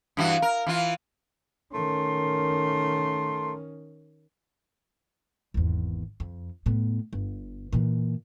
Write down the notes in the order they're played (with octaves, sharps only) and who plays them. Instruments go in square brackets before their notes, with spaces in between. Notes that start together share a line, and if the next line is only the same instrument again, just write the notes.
[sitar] G2 E3 F#4
A#4
E3 F4
[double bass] D#3 C#4 [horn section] A3 A#4 C6
[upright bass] G#1 E2
F2
A2 B3
G1
A#2 E3